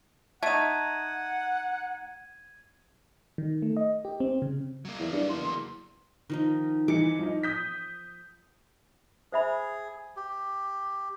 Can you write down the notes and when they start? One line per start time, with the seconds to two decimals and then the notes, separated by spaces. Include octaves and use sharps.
0.43 A3 D#4 F#5 G#6 D#7
3.38 D#3
3.62 A3
3.77 D#5
4.05 G4
4.20 C4
4.42 C#3
4.85 F#3 A#3
4.99 E2
5.13 G2
5.29 E2 C6
6.30 D#3 F3 D#4
6.88 E3 D#4 D6 C#7
7.19 F3 D#4
7.43 D#6 G6 B6
9.32 G#4 C5 E5 B5
10.17 G4